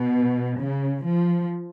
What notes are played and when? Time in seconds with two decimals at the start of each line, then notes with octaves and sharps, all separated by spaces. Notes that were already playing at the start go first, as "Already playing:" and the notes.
Already playing: B2
0.59 C#3
1.03 F3